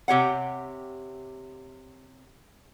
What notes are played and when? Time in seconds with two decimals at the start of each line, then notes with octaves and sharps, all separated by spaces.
0.08 C3 G4 C#5 F#5